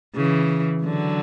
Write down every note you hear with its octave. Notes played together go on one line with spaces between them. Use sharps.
C#3 E3
D3 F#3